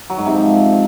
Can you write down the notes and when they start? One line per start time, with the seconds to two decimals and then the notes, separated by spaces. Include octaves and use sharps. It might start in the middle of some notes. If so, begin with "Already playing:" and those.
0.10 F#3
0.18 G#2
0.26 C3
0.35 F3